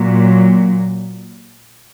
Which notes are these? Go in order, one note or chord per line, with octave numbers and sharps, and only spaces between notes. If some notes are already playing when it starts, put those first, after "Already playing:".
Already playing: A#2 F#3